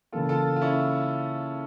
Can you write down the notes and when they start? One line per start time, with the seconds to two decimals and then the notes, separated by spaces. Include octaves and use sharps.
0.12 C#3 E3 A#3 F4 A4
0.29 F4 A4
0.56 F4
0.62 C#4 E4